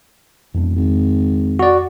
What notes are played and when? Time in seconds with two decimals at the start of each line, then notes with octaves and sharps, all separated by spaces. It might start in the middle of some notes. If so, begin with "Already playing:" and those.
0.54 E1 F2 D4
0.76 G#1
1.59 F#4 D5